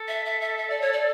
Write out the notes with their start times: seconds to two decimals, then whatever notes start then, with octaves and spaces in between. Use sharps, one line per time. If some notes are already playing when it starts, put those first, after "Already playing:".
Already playing: A4
0.08 E5
0.25 E5
0.41 E5
0.57 E5
0.70 D5
0.81 C#5
0.93 D5